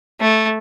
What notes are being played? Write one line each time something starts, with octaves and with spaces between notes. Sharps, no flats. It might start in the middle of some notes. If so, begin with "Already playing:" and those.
A3